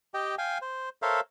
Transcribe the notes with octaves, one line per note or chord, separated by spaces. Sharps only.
G4 D#5 G5
F5 G5 G#5
C5
A4 A#4 C5 C#5 E5 F5